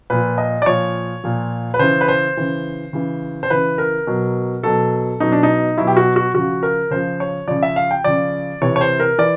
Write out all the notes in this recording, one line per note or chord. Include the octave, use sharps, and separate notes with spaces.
A#2 F3 B4
D#5
D5
A#2 F3 C#5
A#2 F3
B4
C#3 E3 C5
B4
C5
C#3 E3
C#3 E3
C5
C#3 E3 B4
A#4
B2 F#3
B2 F#3 A4
B2 F#3 D#4
D4
D#4
B2 F#3 E4
G4
F#4
F#4
C#3 F3 F#4
A#4
C#3 F3 C5
C#5
C#3 F3 D5
E5
F5
G5
C#3 F3 D5
C3 E3 C#5
C#5
C5
A#4
E3 D5